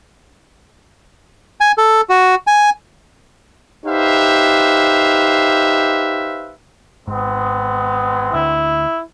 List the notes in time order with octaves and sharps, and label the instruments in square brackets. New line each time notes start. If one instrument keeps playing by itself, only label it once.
[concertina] G#5
A4
F#4
G#5
[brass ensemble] D#4 G4 B4 C5 E5 F5
[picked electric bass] G#1 G#2 [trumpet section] G#3 B3 C4
[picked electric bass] D2 D3 [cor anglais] E4